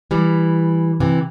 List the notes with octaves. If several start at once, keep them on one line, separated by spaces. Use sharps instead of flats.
E3 G3
C3 E3